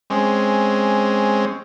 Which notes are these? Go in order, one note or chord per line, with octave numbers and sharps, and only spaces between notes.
G#3 C4 C#4